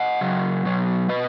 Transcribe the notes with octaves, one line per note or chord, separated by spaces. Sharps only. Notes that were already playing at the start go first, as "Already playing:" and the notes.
Already playing: D#5 F#5
C#3 F#3
B2 F#3
B2 B4 D#5